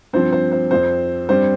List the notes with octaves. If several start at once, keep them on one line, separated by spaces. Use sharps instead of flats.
G2 F3 C4 C5
C5
C5
F2 F3 C4 C5
G2 G3 C4 C5